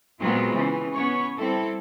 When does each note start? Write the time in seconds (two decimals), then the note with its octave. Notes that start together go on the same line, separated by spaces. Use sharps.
0.20 A#2 F#3 G#3 B3 C4 F4
0.54 C#3 E3
0.94 B3 C#4 C#5
1.39 G3 C4 E4 A4